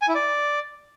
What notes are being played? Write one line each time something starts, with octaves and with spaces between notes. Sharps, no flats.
G#5
E4
D5